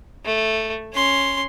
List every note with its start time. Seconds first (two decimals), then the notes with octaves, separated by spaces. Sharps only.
0.25 A3
0.93 C#4 C6